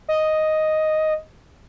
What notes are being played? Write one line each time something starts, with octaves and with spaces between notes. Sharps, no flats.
D#5